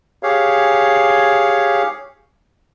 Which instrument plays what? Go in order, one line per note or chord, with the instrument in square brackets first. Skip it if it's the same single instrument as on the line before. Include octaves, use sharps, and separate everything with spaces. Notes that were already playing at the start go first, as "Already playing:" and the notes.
[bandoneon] G4 G#4 C#5 F5